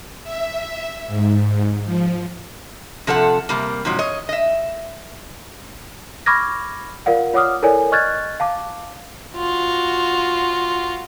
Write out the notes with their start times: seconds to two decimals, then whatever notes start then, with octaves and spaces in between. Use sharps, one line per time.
0.24 E5
1.07 G#2
1.85 F3
3.07 C3 F3 A4 C5 F#5
3.49 C3 G3 A#3
3.85 G#2 C3 F3 F#3
3.99 C#5 D#5
4.29 D#5 E5
6.26 B5 C#6 D6 F6 G#6 A#6
7.06 F4 A#4 D5 F5 F#5
7.33 F4 C#5 F#5 D6 D#6 F6
7.62 E4 A4 A#4 C#5 D5 G#5
7.92 D#5 C#6 F6 F#6 G#6 A6
8.40 F5 A5 D6
9.37 F4 F#4